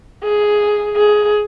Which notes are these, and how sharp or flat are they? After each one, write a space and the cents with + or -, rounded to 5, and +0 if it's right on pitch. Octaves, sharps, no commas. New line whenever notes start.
G#4 +5
G#4 +10